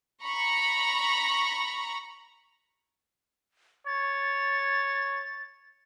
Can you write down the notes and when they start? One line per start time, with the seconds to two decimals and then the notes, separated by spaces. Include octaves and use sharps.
0.23 A#5 B5 C#6
3.87 C#5 A6